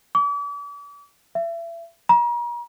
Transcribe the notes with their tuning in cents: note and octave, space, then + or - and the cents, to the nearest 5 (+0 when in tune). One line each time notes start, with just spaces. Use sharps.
D6 -40
E5 +35
A#5 +40